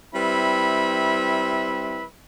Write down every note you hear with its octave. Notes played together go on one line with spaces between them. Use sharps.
G3 C4 E4 B4 E5 B5